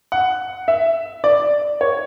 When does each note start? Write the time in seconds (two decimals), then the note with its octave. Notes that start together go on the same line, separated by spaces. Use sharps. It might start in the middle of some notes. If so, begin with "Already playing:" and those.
0.12 F#5
0.68 E5
1.24 D5
1.81 C#5